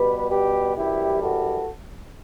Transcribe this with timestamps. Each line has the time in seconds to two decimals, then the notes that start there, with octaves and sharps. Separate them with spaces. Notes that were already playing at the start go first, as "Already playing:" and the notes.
Already playing: B2 G3 G4 B4
0.30 G4 B4
0.76 F#2 E3 G3 E4 G4
1.21 F#4 A4